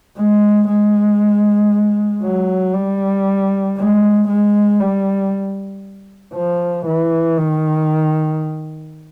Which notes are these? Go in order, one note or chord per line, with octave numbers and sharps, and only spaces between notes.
G#3
G#3
F#3
G3
G#3
G#3
G3
F3
E3
D#3